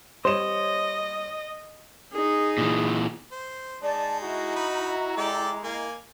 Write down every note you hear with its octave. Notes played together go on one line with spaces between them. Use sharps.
G3 C5 C#5 D#5 E7
D#4 G#4
A#2 E3
C5
G#3 D#4 D5 A5
E4 F#4 D#5 A#5
D#4 B5
G#3 G4 A4 D5
A#3 G#5